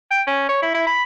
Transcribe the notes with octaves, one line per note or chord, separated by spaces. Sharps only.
G5
C#4
C#5
E4
E4
B5